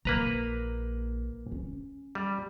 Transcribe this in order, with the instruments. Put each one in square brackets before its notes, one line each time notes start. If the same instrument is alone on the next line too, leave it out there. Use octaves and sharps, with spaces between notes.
[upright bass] A#1 [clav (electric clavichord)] A#3 B4 A#5
[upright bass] C#4
[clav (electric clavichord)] G3